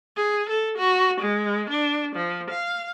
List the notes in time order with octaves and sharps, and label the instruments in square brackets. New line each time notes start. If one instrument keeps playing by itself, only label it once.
[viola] G#4
A4
F#4
G#3
D4
F3
F5